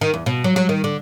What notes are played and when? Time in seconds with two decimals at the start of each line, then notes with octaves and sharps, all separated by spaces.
0.01 D#3
0.14 E2
0.26 B2
0.44 F#3
0.56 F#3
0.69 D#3
0.84 D3